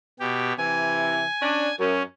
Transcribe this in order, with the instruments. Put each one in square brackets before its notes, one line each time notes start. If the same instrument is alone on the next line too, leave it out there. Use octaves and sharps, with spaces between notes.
[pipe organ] B2 G4
[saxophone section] C3 E3 [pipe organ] G#5
[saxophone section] C#4 D4
[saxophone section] F#2 [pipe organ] C#4